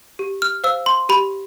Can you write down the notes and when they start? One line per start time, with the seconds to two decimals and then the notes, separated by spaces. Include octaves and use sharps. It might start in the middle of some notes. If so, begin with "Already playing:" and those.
0.19 G4
0.42 F6
0.64 C5 F5 E6
0.86 C6
1.09 G4 B5